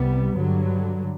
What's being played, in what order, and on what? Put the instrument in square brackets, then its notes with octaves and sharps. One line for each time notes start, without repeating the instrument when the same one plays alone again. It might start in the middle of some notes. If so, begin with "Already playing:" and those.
Already playing: [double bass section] C2 C3 G3 B3
G2 D3 F#3